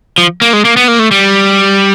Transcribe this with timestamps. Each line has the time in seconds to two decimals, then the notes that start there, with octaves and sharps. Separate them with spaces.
0.18 F3
0.42 A#3
0.53 G#3
0.65 A#3
0.77 B3
0.88 A#3
0.99 A3
1.11 G3